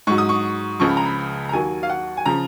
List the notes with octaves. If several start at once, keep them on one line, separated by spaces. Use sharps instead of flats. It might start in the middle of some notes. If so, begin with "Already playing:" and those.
G#2 F#3 C#6
D#6
C#6
C#2 C#3 F3 C#6
B5
A#5
B5
A#5
D#2 D#3 F#3 G#5
F5
F#5
G#5
C#3 F3 A#5